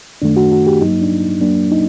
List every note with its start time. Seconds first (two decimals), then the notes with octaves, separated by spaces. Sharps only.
0.22 F#2 D#3 A3 D4
0.37 F#4
0.52 F#4
0.67 G4
0.81 G2 F#3 A#3 D#4
1.02 D4
1.41 F#2 F#3 A#3 D4
1.71 D#4